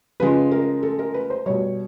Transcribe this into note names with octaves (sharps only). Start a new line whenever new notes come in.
C#3 F3 G#3 B4
A#4
A4
A#4
B4
C5
B2 G3 C#5